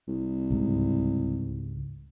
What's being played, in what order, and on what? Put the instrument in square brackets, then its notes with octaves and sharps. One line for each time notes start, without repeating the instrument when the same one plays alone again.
[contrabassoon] C2
[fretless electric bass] C#2 G#2